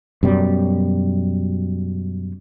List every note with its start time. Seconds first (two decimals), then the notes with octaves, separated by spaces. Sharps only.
0.23 F#2 B2 G3